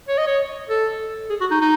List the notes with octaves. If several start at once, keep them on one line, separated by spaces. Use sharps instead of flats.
C#5
D#5
C#5
A4
G#4
F#4
D#4
D#4